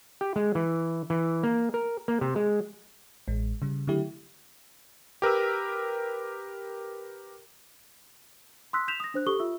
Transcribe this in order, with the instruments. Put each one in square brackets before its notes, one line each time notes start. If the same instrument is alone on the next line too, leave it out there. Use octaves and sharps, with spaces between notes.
[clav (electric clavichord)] G4
G#3
E3
E3
A#3
A#4
A#3
C3
G#3
[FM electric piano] A1 G#3
C#3 G3
D3 F#3 A3 E4 G4
[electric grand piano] G4 A#4 B4 E6
[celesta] C6 D#6 E6 F#6 B6
G6 B6 E7 F7
D#6 A#6
D4 C5 F#6
G4 A4 C#6 D#6 G7
F4 E5 E6